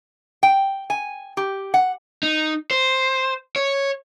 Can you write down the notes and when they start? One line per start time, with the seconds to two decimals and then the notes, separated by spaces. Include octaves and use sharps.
0.43 G5
0.90 G#5
1.37 G4
1.74 F#5
2.23 D#4
2.71 C5
3.56 C#5